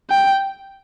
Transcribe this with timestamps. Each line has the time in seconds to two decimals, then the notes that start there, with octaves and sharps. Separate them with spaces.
0.10 G5